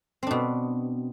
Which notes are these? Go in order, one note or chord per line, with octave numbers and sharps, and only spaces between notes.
B2 C4 D4